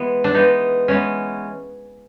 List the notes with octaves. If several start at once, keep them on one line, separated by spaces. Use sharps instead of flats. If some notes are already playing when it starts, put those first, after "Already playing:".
Already playing: E3 G#3 B3
D4
E3 G#3 B3 D#4
E3 G#3 B3 C#4